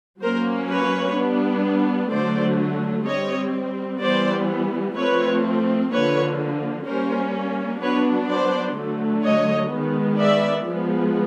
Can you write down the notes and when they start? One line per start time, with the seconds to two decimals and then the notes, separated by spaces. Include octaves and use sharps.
0.21 F#3 A#3 C#4 A#4 C5
0.69 B4 C#5
1.16 G3 B3 D4
2.11 D3 F#3 A3 C5 D5
3.07 G3 C4 C#5 D#5
4.01 E3 G3 B3 C5 D5
4.96 F3 A3 C4 B4 C#5
5.91 D3 F3 A#3 B4 C#5
6.86 G3 A#3 C#4 A#4 C5
7.82 F#3 B3 D4 B4 C#5
8.29 C5 D5
8.77 D3 F#3 A3
9.24 C#5 D#5
9.72 D#3 G#3 B3
10.19 D5 E5
10.66 F3 G#3 B3